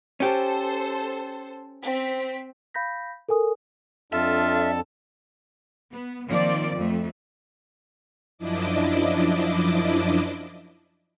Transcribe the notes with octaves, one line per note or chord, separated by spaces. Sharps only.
C#4 G4 A4 C5
C4 B6
F5 B5 G6 A#6 B6
A4 A#4 G#5 D#6
F2 D4 F4 A4 E5 A5
B3
D#3 F3 A#3 C4 D5
F2 A3
F#2 F3 D4 E4 D#5 D6